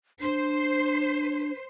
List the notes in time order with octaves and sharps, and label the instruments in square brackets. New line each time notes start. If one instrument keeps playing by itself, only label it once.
[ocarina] D4 [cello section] C5